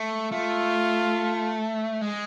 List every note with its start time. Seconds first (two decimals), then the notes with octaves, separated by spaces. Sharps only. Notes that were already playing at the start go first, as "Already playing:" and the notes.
Already playing: A3
0.32 A3 F4
2.01 G#3